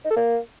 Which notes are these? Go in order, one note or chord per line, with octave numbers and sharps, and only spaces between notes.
D#4
A4
A#3